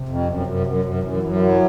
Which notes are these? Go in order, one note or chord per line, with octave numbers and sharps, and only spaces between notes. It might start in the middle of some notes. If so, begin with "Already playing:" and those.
Already playing: C3
F2
F#2
F#2
F#2
F#2
F#2 E3
F#2
F#3